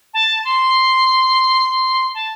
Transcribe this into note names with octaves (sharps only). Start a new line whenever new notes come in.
A5
C6
A5